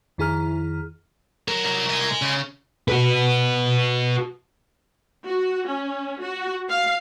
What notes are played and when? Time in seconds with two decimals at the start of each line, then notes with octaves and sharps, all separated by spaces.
0.18 F2 D#3 E4 G#4 A#5 F6
1.48 F#3 A#4
1.64 C2 A#4
1.91 D#5 G#5
2.22 C#3
2.88 F#4 B4
5.27 F#4
5.67 C#4
6.21 F#4
6.69 F5